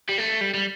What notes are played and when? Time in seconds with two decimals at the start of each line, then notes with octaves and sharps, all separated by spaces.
0.09 G3
0.18 A3
0.41 G3
0.54 G3